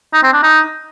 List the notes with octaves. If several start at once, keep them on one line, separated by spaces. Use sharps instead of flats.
D#4
C4
D4
D#4